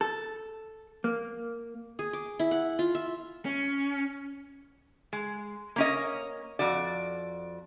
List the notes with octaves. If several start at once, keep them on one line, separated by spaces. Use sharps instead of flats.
A4
A#3
G#4
D6
E4
F#5
F4
E5
C#4
G#3
A#3 C#4 D#5
F2 F#4 D5